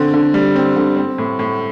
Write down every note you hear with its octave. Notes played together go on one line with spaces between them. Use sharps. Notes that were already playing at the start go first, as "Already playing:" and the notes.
Already playing: D3 C4
D3
G3
C4
D3
C4
A2
A2